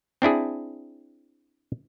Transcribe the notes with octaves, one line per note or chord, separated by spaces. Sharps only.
C4 D4 E4 G#4